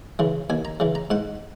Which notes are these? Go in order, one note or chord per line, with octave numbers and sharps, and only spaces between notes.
C#3 E3
D#2 G#5
A#5
C#3 E3
A#5
G#2 F#5